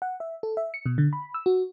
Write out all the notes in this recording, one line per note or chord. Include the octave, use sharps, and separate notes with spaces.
F#5
E5
A4
E5
C#7
B2
D3
B5
E6
F#4